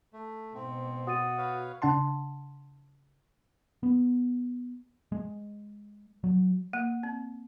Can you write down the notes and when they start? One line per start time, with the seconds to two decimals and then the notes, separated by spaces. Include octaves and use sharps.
0.13 A3
0.55 G#2 B2 C4
1.07 F#4 D#6 A6 D#7
1.38 B4 C#5 F5
1.82 C#3 D4 F#5 A5 C6
3.83 B3
5.12 G#3
6.24 F#3
6.73 A#3
7.03 C4